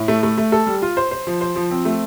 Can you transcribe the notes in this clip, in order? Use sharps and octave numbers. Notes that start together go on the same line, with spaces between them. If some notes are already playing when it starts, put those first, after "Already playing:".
Already playing: A2
A3
A3
A3
A4
G3
F4
C5
C5
F3
C5
F3
C4
A3